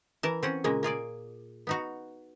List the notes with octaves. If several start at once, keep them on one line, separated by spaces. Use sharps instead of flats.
E3 A#4 A5
C4 C#4 F#5
A#2 C#3 G#3 A#3
A#3 F4 G#4 D5
B3 D#4 F#4